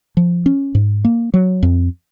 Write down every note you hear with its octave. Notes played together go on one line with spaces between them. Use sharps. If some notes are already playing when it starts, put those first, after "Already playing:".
F3
C#4
G#2
A#3
F#3
F2